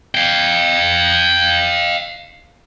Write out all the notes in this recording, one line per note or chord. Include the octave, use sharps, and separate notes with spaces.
F5 G5